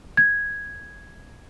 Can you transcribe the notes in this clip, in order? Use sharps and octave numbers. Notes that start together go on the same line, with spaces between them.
G#6